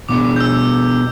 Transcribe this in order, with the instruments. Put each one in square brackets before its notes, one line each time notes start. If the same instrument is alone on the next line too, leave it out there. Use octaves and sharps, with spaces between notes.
[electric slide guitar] B2 B3 D4 [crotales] D6
[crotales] G6
E6